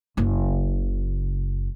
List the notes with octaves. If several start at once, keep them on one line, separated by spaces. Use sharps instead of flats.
F#1 C#3